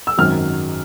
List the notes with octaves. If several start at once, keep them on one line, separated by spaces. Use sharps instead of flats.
E6
G#1 F#2 D#3 F#3 F6